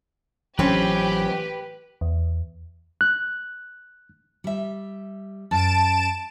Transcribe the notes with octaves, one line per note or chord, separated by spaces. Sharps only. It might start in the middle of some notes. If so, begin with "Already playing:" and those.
A1 E3 F#3 C4 C#4 G4 B4
E2
F#6
G3 E5
F#2 A5 D7 E7